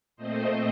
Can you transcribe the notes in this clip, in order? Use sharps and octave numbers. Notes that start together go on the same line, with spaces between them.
A#2 A3 C4 C5 D#5